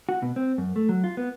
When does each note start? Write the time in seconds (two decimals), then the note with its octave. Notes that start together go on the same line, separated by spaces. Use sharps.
0.09 F#4
0.22 B2
0.36 C4
0.58 F#2
0.76 A3
0.89 F#3
1.04 F4
1.17 B3